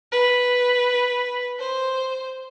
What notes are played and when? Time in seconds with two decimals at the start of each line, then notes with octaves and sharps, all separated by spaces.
0.11 B4
1.59 C5